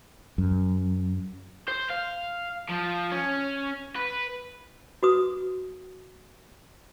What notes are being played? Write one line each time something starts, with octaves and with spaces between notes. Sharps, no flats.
F#2
C5
F5
F3
C#4
B4
F#4 B4 D#6